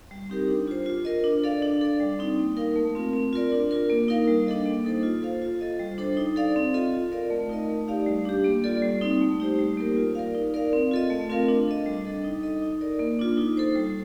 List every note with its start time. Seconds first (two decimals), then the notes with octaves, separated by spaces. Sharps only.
0.11 G3
0.30 C4 D#4 G4 A#4
0.48 D4
0.67 F4 C5
0.86 F4
1.05 A#4 D#5
1.24 D4
1.44 A4 D5 F5
1.62 D4
1.81 A4 D5
2.00 G3
2.19 C4 D#4
2.38 A#3
2.57 D#4 A#4 F5
2.76 A3
2.95 C4 F4 A#4
3.13 C4
3.33 F4 A#4 D5
3.52 D4
3.71 F4 A#4
3.90 A#3
4.08 D#4 A#4 F5
4.27 G3
4.47 D4 A4 D#5
4.65 A#3
4.85 D#4 A4 C5
5.03 F4
5.22 A4 C5 F5
5.42 F4
5.61 A4 D#5
5.79 G3
5.98 D4 A4 C5
6.17 D#4
6.36 A4 D5 F5
6.56 C4
6.74 F4 A4 D#5
6.93 F4
7.12 A#4 D5 F5
7.30 A3
7.49 D#4 A#4 D#5
7.69 A3
7.88 D#4 G4 D5 F5
8.06 G3
8.25 D4 G4
8.44 A#3
8.64 F4 A4 D5
8.82 G3
9.01 C4 D#4
9.21 A3
9.40 D#4 G4 C5
9.59 G3
9.77 A#3 D#4 G4 A#4
9.97 F4
10.15 A#4 D5 F5
10.35 D#4
10.54 A#4 D5 F5
10.73 C4
10.91 F4 A4 D#5
11.10 A3
11.29 C4 F4 A#4 F5
11.48 D4
11.68 A4 D#5
11.86 G3
12.05 D4 A4 D#5
12.24 D#4
12.43 A4 D#5
12.62 D#4
12.81 A#4 D5
13.00 A#3
13.19 D4 F4
13.38 D#4
13.57 A4 C5
13.76 G3